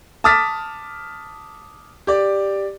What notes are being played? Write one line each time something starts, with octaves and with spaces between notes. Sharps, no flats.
A5 D6 D#6 F6 A6 B6
G4 D5